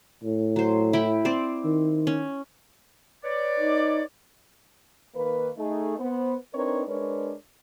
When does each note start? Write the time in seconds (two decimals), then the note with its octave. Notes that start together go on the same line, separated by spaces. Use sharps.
0.23 A2
0.56 F#3 C5
0.93 E4 G5 B5
1.25 C4 C5 D5
1.65 D#3
2.07 C#4
3.24 B4 C#5 D5
3.60 D#4
5.14 D#3 A#3 B4
5.57 A3 D#4 G#4
5.98 B3 C5
6.53 C4 D4 D#4 A#4 B4 C#5
6.86 G#3 D4 A#4 B4 C#5